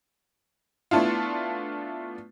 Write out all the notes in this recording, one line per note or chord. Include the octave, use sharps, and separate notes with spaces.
A3 B3 D4 E4 F4